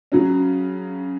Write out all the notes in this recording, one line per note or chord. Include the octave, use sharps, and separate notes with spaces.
C#3 F#3 C#4